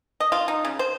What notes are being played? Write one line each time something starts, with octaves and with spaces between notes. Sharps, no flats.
D#5
F4
D#4
C#3
C5